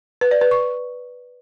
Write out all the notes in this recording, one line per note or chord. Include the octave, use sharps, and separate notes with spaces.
B4
D5
B4
C#6